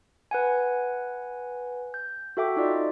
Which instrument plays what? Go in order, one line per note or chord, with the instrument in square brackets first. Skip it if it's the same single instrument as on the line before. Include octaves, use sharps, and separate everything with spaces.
[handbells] B4 F#5 G#5
G6
F#4 A4 E5 G5 D6
D#4 F4 D5 D#5